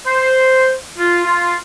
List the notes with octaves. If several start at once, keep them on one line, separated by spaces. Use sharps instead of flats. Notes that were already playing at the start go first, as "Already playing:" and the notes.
C5
F4
F4